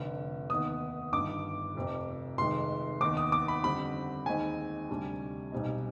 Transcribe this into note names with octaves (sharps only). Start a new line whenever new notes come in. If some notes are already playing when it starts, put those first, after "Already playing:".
Already playing: F1 F2 D3
D#2 D#3 B3 D#6
G1 G2 D#3 D6
F1 F2 C3
F1 F2 D#3 G#3 C6
D#2 D#3 B3 D6
D#6
D6
B5
F2 D3 G3 C4 B5
D#2 D#3 G#3 C4 D#4 G#5
D2 C3 G3 D4
B1 B2 G3 C4 D#4